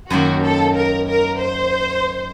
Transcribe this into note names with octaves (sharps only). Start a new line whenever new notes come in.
F#2 D#3 A#3 F#4
A4
A#4
A#4
C5